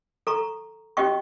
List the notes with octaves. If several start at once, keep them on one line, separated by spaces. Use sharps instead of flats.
A4 A#5 C#6
C#4 F#4 G4 D#5 G5 C#6